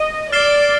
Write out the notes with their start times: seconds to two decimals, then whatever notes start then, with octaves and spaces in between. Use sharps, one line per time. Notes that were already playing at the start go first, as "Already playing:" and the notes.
Already playing: D#5
0.32 D5 F6 A6 C7 E7 G7